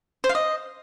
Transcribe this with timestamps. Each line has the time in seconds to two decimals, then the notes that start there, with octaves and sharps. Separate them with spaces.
0.24 C5
0.29 F5
0.35 D#5